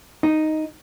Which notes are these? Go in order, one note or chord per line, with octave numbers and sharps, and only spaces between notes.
D#4